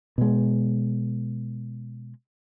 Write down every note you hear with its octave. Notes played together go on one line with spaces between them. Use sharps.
B2 G#3